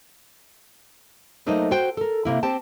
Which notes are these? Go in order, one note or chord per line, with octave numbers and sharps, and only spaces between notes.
F#3 A3 A#3 D#4 C5 D#5
F#4 C5 G5
A4 A#4
C3 A#3 E4
C4 G4 C5 G5 A5